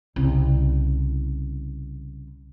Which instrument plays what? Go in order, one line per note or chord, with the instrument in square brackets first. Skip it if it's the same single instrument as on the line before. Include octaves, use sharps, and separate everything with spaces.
[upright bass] C2 C#3